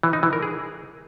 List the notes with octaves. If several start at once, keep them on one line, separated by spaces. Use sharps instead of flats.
E3
D#4
E3
A#4
G#4